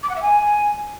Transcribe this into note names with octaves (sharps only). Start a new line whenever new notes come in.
D6
F#5
E5
G#5